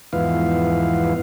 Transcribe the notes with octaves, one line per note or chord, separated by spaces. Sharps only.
E2 G#2 E3 F3 B3 F5